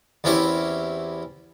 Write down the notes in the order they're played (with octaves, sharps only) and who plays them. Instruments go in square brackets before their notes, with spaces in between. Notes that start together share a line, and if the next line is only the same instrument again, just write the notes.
[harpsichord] E2 C4 C#4 E4 G4 C6